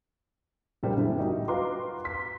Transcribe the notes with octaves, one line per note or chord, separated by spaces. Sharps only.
A#1 A#2 C#3 G3 C5
F#2 A2 D3 A3
G3 D#4 F#4
F4 F#4 B4 A#5 C6 D6
C6 B6